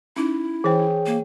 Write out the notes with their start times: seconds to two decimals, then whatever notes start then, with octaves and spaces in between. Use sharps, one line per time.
0.16 C#4 D#4 E4
0.64 E3 G#4 C5 C#5 G5
1.06 A#3